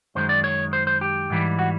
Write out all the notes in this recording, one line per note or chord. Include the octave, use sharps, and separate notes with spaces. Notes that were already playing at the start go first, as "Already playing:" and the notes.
F#2 D#3 G#3 C5
D5
C#5
C5
C5
G4
G#2 E3 G3
F#4